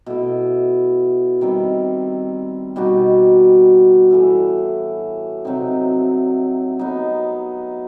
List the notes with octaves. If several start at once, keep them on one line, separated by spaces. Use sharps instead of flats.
B2 A3 E4
D#3 G3 C4
B2 G3 D#4 F#4
A2 E3 A3
C3 F#3 C4 D#4
F#3 B3 D#4